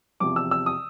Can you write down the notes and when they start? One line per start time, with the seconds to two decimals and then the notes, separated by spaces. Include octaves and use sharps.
0.20 E2 C3 F3 D6
0.36 E6
0.51 E6
0.66 D#6